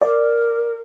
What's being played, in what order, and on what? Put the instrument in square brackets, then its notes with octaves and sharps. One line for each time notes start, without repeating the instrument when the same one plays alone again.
[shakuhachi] A#4 [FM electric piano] D5